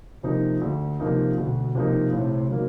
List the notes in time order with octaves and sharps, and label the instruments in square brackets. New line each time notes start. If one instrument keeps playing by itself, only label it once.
[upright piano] C3 F3 A#3 D#4
D2
C3 F3 A#3 D#4
[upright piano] D2 [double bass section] B2
[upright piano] C3 F3 A#3 D#4
[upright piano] A2 [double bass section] C3
[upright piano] F#3 A#3 D#4